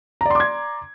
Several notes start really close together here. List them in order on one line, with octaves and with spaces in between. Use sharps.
A#5 D5 C6 D6 G#6